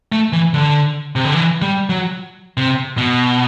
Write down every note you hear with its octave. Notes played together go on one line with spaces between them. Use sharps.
A3
E3
D3
C3
D3
E3
G3
F#3
C3
B2